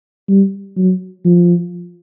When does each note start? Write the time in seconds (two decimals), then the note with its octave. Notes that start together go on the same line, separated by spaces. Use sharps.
0.29 G3
0.77 F#3
1.25 F3